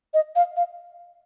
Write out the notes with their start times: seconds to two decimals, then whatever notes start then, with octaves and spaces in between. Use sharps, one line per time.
0.14 D#5
0.36 F5
0.57 F5